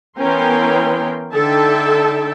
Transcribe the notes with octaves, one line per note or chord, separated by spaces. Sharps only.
E3 B3 C#4 A#4 G5 C6
D3 D#4 A4 E5 G5 A5